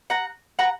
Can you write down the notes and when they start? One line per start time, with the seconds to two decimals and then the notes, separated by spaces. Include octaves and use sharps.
0.10 F#5 A#5
0.59 F#5 A#5